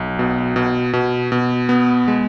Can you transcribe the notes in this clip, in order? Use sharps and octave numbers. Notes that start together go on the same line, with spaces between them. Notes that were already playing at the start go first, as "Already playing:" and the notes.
Already playing: B1
B2
B2
B2
B2
B3
G#3